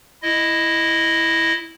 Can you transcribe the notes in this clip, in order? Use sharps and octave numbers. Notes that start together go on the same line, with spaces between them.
E4 D#5